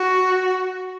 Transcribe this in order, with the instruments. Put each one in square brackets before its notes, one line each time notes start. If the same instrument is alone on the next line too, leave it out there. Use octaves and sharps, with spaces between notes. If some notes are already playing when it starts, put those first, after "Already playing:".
Already playing: [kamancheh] F#4